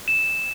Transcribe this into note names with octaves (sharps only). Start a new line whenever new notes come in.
E7